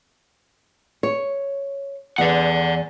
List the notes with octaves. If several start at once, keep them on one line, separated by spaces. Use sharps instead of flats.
C#5
E2 D5 F#5